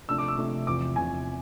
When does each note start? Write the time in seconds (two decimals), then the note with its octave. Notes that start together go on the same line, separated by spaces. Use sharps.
0.09 C3 F3 A3 D4 E6
0.18 D6
0.28 E6
0.37 C3 F3 A3 D4
0.67 E2 C3 F3 D6
0.96 E2 C3 F3 G#5